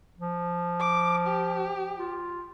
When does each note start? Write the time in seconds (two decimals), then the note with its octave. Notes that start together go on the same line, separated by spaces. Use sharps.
0.18 F3
0.80 D6
1.27 G4
1.97 F4